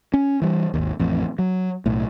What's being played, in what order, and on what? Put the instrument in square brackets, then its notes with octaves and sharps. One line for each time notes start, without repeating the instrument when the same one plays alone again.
[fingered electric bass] C#4
E3 G3
G#1 D#2
A1 F2
F#3
B1 A2